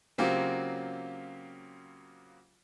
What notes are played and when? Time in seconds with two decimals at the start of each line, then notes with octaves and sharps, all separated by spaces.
0.18 C#3 F#3 A#3 C4 F4 G4